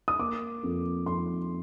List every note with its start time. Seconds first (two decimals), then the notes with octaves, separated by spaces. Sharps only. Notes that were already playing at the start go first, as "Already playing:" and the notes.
0.08 D#6
0.19 A#3 D6
0.63 F2
1.06 F2 C6